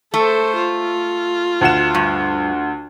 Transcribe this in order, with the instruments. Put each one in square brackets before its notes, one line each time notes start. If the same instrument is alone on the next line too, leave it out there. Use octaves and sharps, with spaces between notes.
[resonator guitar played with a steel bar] A3 [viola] A4 C5
[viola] F4
[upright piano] D2 F#5 E7
[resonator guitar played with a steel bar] G2